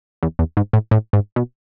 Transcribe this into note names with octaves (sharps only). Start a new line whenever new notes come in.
E2
E2
G#2
A2
A2
G#2
B2